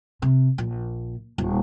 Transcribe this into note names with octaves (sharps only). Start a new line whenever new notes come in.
C3
A#1
D#1